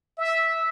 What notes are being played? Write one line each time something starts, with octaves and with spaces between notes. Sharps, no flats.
E5